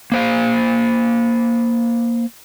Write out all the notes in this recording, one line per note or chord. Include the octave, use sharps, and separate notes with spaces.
A#3 C5 F5